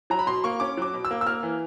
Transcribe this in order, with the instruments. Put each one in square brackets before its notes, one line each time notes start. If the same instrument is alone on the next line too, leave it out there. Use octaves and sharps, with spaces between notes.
[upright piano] F#3 A#5
B5
B2 C6
A#3 C#6
C#4 D6
F#3 D6
B2
E6
A#3
E6
A#3 F6
E3